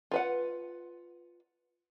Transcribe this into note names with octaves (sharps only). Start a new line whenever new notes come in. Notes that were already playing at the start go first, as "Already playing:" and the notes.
F4 B4 F#5